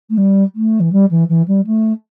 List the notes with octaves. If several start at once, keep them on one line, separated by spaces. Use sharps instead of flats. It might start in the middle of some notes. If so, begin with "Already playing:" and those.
A3
G3
A3
E3
G3
E3
E3
G3
A3